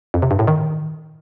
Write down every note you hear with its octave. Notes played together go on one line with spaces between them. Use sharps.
F2
C3
G2
A2
D#3